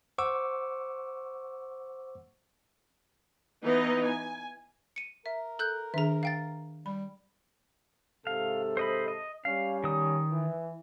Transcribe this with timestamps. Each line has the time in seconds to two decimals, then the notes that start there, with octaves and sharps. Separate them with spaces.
0.18 C5 F#5 C#6 D6 E6
3.65 E3 B3 D#4 D#5
4.04 G#5
4.96 C#7 D#7
5.26 A#4 E5
5.59 A4 F#6 G6
5.94 D#3 D4 G#4 E5 A#5
6.23 F5 G5 A6
6.86 G3 B5
8.27 G#2 C3 A4 F5
8.77 C5 D#5 B5
9.08 D#5
9.45 G3 C#4 F5
9.84 D#3 D#6
10.31 E3